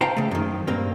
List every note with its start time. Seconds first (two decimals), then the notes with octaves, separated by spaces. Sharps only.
0.01 C5 F5 G5 A5 A#5
0.17 C#3 A3
0.31 F#2 D#3
0.67 G2 A#2 A#3 C4